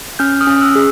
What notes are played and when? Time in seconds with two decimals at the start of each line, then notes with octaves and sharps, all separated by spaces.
0.19 C#4 F6 G6
0.41 D#6 F6
0.47 C#4
0.61 E6 F#6
0.75 G#4